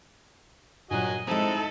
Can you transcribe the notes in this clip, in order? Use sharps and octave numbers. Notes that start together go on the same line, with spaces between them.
G2 A#2 F#3 F#4 D#5 G#5
G#3 C4 D#4 E4 A4